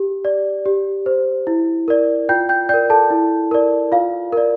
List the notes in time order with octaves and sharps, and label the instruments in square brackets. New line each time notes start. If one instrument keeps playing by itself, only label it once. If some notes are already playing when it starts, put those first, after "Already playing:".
Already playing: [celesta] G4
D5
G4
C5
E4
A#4 D5
F4 G5 G6
G5 G6
A#4 D5 G5 G6
A4 A5
E4
A#4 D5
F4 F5
A#4 D5